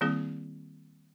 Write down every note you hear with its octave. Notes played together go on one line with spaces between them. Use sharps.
D#3 G3 A#3 C4 E4 G#4